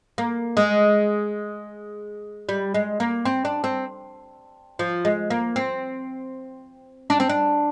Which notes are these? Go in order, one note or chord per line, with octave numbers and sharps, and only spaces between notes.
A#3
G#3
G3
G#3
A#3
C4
D4
C4
F3
G#3
A#3
C4
D4
C4
D4